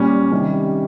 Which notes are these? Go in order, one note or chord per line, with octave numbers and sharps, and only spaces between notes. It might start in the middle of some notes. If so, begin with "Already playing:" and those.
Already playing: A#2 G3 C#4
C3 D#3 G3 C#4